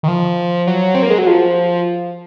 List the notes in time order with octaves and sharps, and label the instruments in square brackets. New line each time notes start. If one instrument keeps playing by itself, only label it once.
[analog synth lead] D#3
F3
F#3
C4
A#3
G#3
F#3
F3